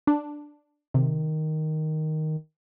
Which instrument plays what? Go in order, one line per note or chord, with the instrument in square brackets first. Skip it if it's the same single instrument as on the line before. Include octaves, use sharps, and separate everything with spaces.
[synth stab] D4
[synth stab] C3 [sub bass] D#3